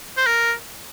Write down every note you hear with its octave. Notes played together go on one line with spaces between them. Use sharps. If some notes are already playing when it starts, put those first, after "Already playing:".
C5
A#4